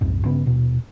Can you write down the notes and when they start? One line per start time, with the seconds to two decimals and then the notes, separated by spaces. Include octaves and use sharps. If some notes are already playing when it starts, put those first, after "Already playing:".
0.01 B1 F2 G#2
0.25 G2 C#3 B3
0.46 D#1 B2